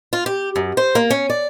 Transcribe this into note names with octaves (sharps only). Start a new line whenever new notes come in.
F4
G4
F#2
C5
A#3
C#4
D5